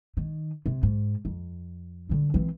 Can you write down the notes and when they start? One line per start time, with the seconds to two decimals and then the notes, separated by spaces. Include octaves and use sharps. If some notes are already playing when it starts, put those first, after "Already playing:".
0.17 D#3
0.66 C3
0.83 G#2
1.25 F2
2.09 D3 G3
2.34 E3 C4